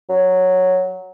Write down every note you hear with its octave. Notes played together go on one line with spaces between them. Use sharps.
F#3